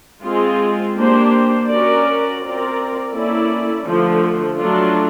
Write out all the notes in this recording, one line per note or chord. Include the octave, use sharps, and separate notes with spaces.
G#3 C4 F4 G#4
A#3 D4 G4 C5
C#4 F#4 A#4 D5
C4 F4 A#4 D5
A#3 C#4 E4 A4 D5
D3 F3 A3
F#3 A3 D4 F4